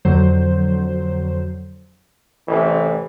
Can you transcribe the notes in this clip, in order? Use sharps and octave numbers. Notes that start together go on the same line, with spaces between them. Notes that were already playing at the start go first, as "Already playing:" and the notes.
F2 D3 F#3 C5
A1 C3 E3